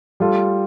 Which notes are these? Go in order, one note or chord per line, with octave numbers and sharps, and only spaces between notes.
G3 F4 A4